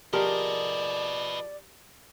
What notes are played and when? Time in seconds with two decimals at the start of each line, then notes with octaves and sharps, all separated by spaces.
0.13 F3 G4 G#4 A#4 B4 D5 D#5